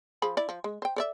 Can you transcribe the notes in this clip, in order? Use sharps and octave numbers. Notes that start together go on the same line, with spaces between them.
F3 G#4 B5
E4 D5
F3
G#3
C5 G5
A4 D5 E5